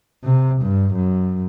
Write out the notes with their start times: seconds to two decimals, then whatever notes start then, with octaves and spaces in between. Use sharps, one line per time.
0.24 C3
0.62 G2
0.95 F#2